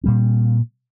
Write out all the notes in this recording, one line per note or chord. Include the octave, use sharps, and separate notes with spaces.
A#2 G3 C4